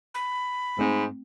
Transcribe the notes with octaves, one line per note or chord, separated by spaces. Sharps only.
B5
G#2 A3 C4